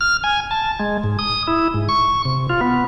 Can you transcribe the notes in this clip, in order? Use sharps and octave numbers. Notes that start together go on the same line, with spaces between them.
F6
G#5
A5
G#3
G#2
D#6
E4
G#2
C#6
C3
F4
B3